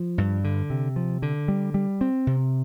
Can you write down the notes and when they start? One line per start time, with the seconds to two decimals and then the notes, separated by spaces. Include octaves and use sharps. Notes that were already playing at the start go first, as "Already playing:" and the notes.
Already playing: F3
0.18 G2
0.44 D3
0.70 C3
0.96 F3
1.22 D3
1.48 G3
1.74 G3
2.01 C4
2.27 C3